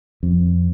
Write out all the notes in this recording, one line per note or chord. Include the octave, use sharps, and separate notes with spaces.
F2